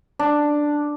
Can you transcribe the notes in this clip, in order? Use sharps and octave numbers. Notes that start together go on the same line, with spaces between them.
D4